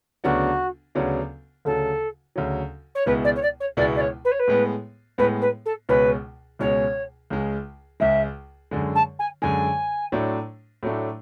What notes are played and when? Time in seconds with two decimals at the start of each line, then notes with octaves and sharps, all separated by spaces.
0.24 D2 C#3 F#3 B3 D4 F#4
0.95 D2 C#3 F#3 B3 D4
1.65 D2 C#3 F#3 A4
2.36 D2 C#3 F#3
2.95 C#5
3.06 C#2 B2 G#3 B3 E4 B4
3.24 D5
3.36 C#5
3.42 D5
3.60 C#5
3.77 C#2 B2 G#3 B3 E4 D5
3.96 D5
4.00 C#5
4.24 B4
4.31 C#5
4.39 B4
4.48 A2 G#3 B3
5.18 A2 G#3 B3 B4
5.41 B4
5.65 A4
5.88 C#2 B2 G#3 C#4 B4
6.59 C#2 B2 G#3 C#4 C#5
7.30 C#2 C#3 G#3
8.00 C#2 C#3 G#3 E5
8.71 F#2 D3 G#3
8.95 A5
9.19 G#5
9.42 F#2 D3 G#3 G#5
10.12 A2 F#3 A3 D4
10.83 A2 F#3 A3 D4